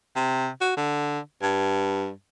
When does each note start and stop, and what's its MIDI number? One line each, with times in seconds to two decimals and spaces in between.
0.16 0.48 48
0.61 0.73 66
0.76 1.19 50
1.42 2.10 43